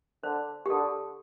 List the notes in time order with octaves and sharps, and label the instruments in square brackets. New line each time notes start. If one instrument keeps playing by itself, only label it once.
[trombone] D3 [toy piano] C5
[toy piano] G4
[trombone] D3 [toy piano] A4